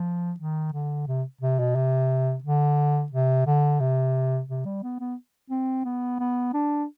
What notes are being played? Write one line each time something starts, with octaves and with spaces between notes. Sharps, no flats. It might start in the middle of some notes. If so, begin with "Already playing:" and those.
Already playing: F3
D#3
D3
C3
C3
B2
C3
D3
C3
D3
C3
C3
G3
B3
B3
C4
B3
B3
D4